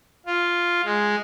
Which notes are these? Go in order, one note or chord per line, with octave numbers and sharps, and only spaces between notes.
F4
G#3